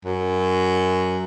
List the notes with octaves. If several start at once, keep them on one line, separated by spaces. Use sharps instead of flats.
F#2